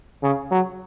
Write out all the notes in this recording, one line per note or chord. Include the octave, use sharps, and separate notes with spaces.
C#3
F#3